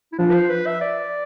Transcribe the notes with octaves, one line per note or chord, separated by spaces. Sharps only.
E4
F3 D4
B4
C5
B4
E5
D5